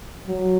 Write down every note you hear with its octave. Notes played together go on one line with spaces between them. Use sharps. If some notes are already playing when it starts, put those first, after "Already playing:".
F#3